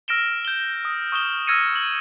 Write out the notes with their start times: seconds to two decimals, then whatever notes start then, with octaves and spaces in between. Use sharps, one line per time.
0.08 E6 F6 A#6 D7 E7 G7
0.45 G6 E7 G7
0.85 D#6
1.12 C#6 D#6 F6 E7 G7
1.47 E6 F6 G#6 A#6 C#7 D#7
1.75 F#7